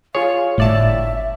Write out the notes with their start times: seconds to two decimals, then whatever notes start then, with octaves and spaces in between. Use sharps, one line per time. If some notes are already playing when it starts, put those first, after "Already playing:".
0.15 F4 G#4 C#5 F5
0.58 G1 A2 D5 E5 A5